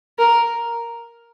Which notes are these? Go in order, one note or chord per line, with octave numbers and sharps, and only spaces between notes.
A#4